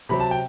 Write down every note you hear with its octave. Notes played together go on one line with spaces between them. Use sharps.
C3 F#3 C4 B5
A5
G5